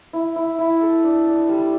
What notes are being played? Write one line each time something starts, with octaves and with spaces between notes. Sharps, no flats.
E4
E4
E4
A4
D4
D4
G3